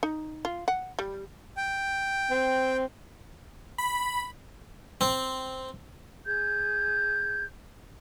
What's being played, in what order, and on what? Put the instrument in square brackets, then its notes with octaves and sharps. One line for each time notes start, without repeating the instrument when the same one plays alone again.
[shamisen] D#4
F4
F#5
G3
[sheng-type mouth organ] G5
[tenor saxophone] C4
[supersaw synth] B5
[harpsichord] C4
[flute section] G#4 G6 G#6